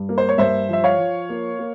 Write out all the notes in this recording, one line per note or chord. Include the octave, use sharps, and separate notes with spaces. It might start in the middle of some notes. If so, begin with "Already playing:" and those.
Already playing: G2
A#3
C5
C#5
G2 C5 E5
F3 E5
C#5 F5
F3
A#3
A#3